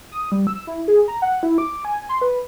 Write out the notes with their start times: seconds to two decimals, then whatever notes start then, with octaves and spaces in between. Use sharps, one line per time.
0.12 D#6
0.32 G3
0.47 E6
0.67 E4
0.88 G#4
1.08 A#5
1.22 F#5
1.43 E4
1.58 D6
1.85 G#5
2.09 C6
2.21 B4